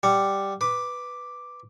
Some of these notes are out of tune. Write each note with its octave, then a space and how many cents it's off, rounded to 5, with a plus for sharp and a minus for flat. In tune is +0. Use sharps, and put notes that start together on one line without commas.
G3 +0 F#5 +0
B4 +0 D6 +0